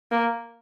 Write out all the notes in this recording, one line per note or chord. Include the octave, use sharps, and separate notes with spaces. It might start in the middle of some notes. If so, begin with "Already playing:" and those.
A#3